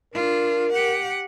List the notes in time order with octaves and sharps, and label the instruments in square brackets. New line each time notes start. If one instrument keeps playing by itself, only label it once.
[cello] D4 F4 [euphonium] A#4
[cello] G4 F#5